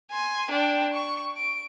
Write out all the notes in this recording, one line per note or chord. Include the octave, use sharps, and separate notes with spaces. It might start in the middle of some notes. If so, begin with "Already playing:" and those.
G#5 C6
D4 G5
C#6
D7